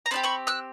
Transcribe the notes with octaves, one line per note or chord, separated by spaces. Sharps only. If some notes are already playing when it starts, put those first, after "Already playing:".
A#5
C4 D#4 G4 A5 B5
B5 C#6
E6 F#6